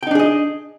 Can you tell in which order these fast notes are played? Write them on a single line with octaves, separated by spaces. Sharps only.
G5 D#4 D4 G#4 D#5